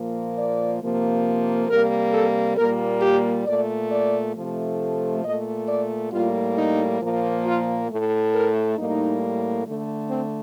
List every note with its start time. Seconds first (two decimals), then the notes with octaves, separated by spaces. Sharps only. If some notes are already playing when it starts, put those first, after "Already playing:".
Already playing: A#2 F3 A#3
0.36 D5
0.80 C3 F3 A#3
1.68 C3 G3 A#3 A#4
2.13 A4
2.57 A#2 G3 A#3 A#4
3.02 G4
3.46 A#2 A3 D5
3.90 D5
4.35 C3 F3 A3
5.23 A#2 A3 D#5
5.67 D5
6.12 A2 G3 A#3 F4
6.56 D#4
7.01 A#2 F3 A#3
7.45 F4
7.89 A2 A3
8.33 A#4
8.77 A2 G3 A#3 D#4
9.66 D3 A3
10.10 C4